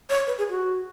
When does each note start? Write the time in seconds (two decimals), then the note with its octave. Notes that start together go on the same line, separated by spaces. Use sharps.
0.10 C#5
0.27 B4
0.38 G#4
0.50 F#4